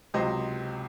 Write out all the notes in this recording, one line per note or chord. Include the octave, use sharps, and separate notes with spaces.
C#2 C3 F#3 C5 D#5